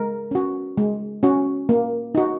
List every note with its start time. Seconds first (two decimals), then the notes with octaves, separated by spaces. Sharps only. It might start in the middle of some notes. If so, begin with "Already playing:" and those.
Already playing: G#3 A#4
0.31 C#4 F#4
0.77 G#3
1.23 C#4 F#4
1.69 A#3
2.15 D#4 F#4